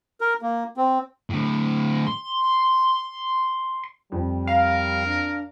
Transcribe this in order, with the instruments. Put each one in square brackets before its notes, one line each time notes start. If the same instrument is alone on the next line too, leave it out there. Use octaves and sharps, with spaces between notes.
[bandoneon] A#4
A#3
C4
[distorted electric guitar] A2 D3
C6
[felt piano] F2 [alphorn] G3
[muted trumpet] A#4 [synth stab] F5
[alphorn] D4